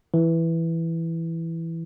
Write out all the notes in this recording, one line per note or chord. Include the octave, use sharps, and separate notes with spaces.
E3